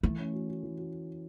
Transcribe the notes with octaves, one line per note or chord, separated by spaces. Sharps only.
E3 A3
C#4
F#4
F#4
E3
F#4